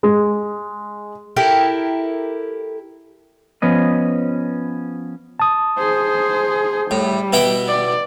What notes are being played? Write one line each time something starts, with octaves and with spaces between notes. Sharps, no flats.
G#3
E4 G4 A4 A#4
F3 B3 C#4 D#5
A5 D#6
G#4 C5
A2 G3
B2 E4 G5
D5